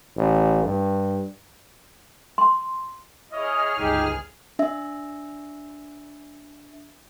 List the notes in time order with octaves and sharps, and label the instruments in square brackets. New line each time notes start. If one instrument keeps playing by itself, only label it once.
[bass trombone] A1
G2
[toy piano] C6
[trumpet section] E4 C#5 D#5 [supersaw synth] G#4 F6
[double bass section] G1 C#2 G#3 [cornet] D#4 [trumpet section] G4
[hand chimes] D4 E5